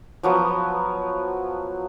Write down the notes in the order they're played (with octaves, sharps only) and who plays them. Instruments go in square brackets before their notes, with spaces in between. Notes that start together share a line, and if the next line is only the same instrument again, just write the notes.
[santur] F3 F#3 B3